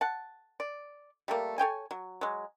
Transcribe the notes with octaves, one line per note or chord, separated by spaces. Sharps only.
F#5 A5
D5
G3 A3 A#3
A4 C#5 G5 G#5
F#3
F#3 G#3